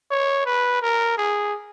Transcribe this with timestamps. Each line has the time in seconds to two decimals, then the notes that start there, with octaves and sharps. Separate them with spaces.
0.11 C#5
0.46 B4
0.82 A#4
1.18 G#4